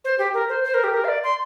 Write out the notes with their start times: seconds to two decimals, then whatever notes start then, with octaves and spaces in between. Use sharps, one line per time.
0.05 C5
0.18 G4
0.34 A#4
0.49 C5
0.64 C5
0.74 A#4
0.84 G4
0.94 A#4
1.04 F5
1.08 D5
1.24 C6